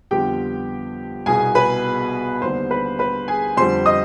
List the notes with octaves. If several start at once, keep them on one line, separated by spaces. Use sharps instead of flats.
F2 D3 G3 B3 F4 G4 G5
C2 B2 B3 G#4 G#5
B4 B5
D#2 D3 G3 B3 D4 C5 C6
B4 B5
B4 B5
G#4 G#5
F2 D3 G3 C5 C6
D#5 D#6